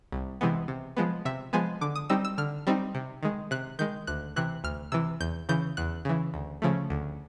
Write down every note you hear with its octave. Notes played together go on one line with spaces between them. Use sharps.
C2
C3 E3 G#3 B3
C3
F3 G#3 B3
C3 E5
F3 G#3 B3 G#5
D3 D6
D#6
G3 C4 D#4 E6
E6
D3 F6
G3 C4 D#4
C3
D#3 G#3
C3 F#6
D#3 G#3 G6
D2 F#6
C3 E3 F#6
D2 F6
C3 E3 E6
E2 G6
C#3 E3 G6
E2 F#6
C#3 E3
D2
C#3 F3 A3
D2